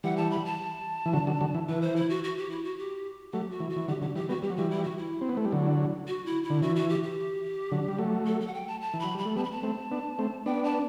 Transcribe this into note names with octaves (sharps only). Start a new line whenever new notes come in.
E3 G3 F#5
A5
B5
A5
E3
D3 F#3
D3 F#3
D3 F#3
E3
E3 B4
C5
E4
F#4
F#4
G4
E4
F#4
G4
F#3 A3 G4
F#4
E3
F#4
E3
D3 F#3 G4
D3 F#3 G4
E3 G3 G4
G3 B3 F#4
G3 G4
F#3
E3 G3 F#4
E4
F#4
E4
C4
B3
A3
G3
D3 F#3
F#4
E4
E4
D3
E3 F#4
F#4
G4
G4
D3 F#3
G3
F#3 A3
A4
A4
F#5
G5
A5
A5
E3
F#3 B5
G3 B5
A3
G3 B3 A5
B5
A5
A3 C4
B3 D4
A3 C4
B3 D4 G5
A5